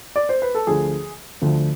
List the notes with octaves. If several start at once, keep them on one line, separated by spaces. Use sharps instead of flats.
D5
C5
B4
A4
D2 D3 F3 G#4
D2 D3 F3